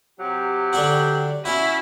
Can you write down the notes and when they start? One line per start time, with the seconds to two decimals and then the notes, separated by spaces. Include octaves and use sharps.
0.20 C3 F#3 G4
0.73 D3 D4 F#4
1.45 C#4 E4 F#4